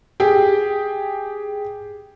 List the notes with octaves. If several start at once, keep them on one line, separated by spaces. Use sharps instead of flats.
G4 G#4 G5